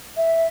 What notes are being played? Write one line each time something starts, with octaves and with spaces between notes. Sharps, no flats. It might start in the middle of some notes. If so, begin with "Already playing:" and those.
E5